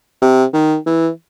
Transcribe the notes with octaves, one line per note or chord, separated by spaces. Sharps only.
C3
D#3
E3